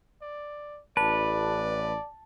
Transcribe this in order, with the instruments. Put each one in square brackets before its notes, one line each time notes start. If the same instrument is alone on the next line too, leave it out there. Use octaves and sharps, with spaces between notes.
[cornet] D5
[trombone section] A1 [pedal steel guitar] B4 [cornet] D5 [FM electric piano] A5